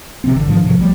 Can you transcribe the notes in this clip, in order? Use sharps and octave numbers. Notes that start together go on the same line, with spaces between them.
C3 F#3 C4
A1 D3 D#3
G#2 D#3 F3 D4
G#2 C3 F3 F#3
A#1 F3 G3 A3